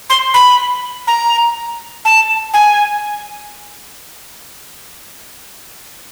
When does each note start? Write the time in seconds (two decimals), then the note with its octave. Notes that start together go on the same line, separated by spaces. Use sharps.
0.10 C6
0.34 B5
1.07 A#5
2.05 A5
2.54 G#5